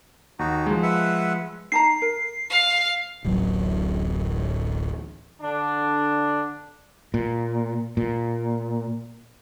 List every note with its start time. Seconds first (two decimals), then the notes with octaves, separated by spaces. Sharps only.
0.39 D#2 D#4 F#4
0.67 F3 G#3
0.83 B4 E5 F#5
1.72 D#4 A5 A#5 C7
2.02 A#4
2.50 F5
3.25 D1 A1 F#3
5.42 D3 D4
7.14 A#2
7.97 A#2